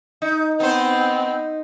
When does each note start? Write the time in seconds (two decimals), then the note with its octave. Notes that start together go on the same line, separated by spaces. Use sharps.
0.22 D#4
0.60 B3 C4 D#4 C5